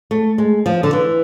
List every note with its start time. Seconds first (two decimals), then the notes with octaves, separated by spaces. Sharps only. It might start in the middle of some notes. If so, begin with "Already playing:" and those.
0.11 A3
0.38 G#3
0.66 F3
0.83 D3
0.93 E3